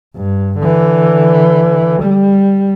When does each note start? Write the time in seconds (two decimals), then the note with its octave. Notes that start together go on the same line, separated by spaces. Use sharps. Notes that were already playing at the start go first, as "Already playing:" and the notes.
0.15 G2
0.59 D3 E3
2.02 G3